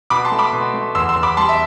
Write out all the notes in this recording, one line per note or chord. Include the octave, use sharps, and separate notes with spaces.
B2 B5 D6
A5 C6
A3
B5 D6
B2
A3
E2 C6 E6
C6 E6
E2
B5 D6
G3 A5 C6
E5